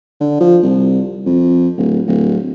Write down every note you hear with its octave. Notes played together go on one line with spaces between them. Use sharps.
D3
F3
C2
F2
D1
D1